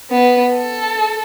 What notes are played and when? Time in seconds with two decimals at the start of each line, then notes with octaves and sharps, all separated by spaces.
0.11 B3
0.52 A4